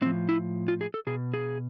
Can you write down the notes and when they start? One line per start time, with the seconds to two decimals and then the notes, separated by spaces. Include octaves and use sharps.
0.02 A2 C4
0.06 F3
0.29 E4
0.68 F4
0.81 G#4
0.94 A4
1.07 B2 G#4
1.34 G#4